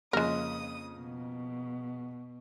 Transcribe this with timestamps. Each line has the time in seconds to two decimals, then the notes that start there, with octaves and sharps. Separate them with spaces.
0.13 F2 C#3 G#3 A#3 A#4 D#6
0.96 B2